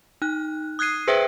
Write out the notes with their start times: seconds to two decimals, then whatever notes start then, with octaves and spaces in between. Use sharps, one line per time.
0.22 D#4 F#6
0.79 D#6 F#6 G#6 C7 D#7
1.08 G#4 B4 C5 E5 G5